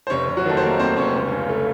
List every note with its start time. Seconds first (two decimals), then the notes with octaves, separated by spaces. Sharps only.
0.07 C5
0.10 F1 C#4 C#5
0.28 F1
0.37 F#3 F#4
0.46 D#3 A3 A4
0.57 C5
0.63 D#3 A#3 A#4
0.79 D#2 C4 C5
0.97 F1 C#4 C#5
1.15 C#2
1.32 C#3
1.49 A3